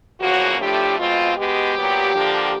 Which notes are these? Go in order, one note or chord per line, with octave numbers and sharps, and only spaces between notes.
E2 C#3 F3 A#3 C#4 F#4
A2 F3 A3 D4 G4
B2 G#3 C4 F4
B2 G#3 B3 G4
A#2 F#3 B3
D3 F3 A#3 D4